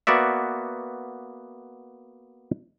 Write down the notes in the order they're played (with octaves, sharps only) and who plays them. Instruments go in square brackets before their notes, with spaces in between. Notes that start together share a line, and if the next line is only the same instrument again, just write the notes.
[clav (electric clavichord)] A#3 B3 F#4 D5 E5